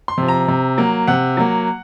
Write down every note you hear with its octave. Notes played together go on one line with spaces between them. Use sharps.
C6
C3 F3
A#5
C3
F#3 A#3
C3 F#5
F#3 A#3